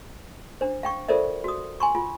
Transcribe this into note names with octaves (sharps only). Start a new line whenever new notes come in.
D4 C5
F5 G5 C#6
F4 A4 A#4 C5 D5 E5
F#4 D#6
G#5 C6 C#6
F4